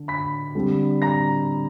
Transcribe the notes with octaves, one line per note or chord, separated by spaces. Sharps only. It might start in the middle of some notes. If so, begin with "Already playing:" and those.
Already playing: D3
B5 B6
D3 G3 C4
A#5 A#6